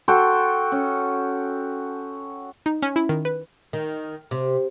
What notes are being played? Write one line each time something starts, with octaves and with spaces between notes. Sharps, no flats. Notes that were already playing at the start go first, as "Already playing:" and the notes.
F#4 A4 G5 C6
C#4
D#4
C#4
E4
D#3
B4
D#3
C3